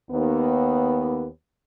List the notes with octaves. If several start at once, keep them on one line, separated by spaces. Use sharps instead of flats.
D#2 B3